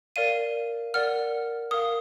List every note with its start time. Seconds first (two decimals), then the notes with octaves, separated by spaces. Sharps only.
0.16 A#4 D5 F5 D#7
0.94 A#4 D5 F#5 F6
1.71 A#4 F5 D#6